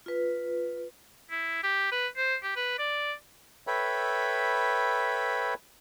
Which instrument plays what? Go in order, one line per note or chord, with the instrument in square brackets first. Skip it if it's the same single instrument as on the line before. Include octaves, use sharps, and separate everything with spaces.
[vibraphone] F4 B4
[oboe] E4
G4
B4
C5
G4
B4
D5
[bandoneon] A4 B4 C#5 E5 G5 B5